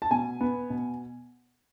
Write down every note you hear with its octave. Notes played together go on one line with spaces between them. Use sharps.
A5
B2 G#5
B3
B2